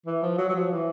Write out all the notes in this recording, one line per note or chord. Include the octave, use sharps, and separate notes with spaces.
E3
F3
F#3
F#3
F3
E3